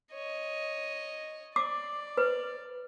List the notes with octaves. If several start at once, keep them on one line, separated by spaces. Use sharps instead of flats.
C#5 D#5
D5 D6
B4